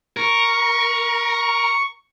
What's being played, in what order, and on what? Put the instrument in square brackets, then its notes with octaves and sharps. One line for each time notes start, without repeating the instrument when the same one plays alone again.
[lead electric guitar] A#4 [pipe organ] C#6